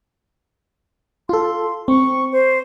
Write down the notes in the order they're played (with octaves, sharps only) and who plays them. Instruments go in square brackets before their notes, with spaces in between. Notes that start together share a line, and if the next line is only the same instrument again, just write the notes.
[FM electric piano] F4 A4 [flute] C6
[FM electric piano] C4 [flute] C#6
[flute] C5